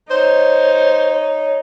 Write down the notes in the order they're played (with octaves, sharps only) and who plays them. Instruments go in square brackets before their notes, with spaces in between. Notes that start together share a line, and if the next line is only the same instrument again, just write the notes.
[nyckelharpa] D#4 [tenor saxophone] C5 [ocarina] C#5